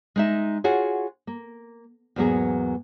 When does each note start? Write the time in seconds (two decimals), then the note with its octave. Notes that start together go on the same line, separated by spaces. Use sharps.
0.16 G#3 D#4 E5
0.64 F4 F#4 G#4 C#5
1.27 A#3
2.16 E2 G#2 F#3 A#3 B3 G#4